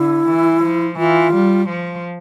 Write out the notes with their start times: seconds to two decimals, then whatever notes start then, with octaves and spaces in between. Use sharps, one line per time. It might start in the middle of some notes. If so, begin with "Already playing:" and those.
Already playing: D3 E4
0.29 E3
0.64 F3
0.99 E3 F4
1.34 G3
1.69 F3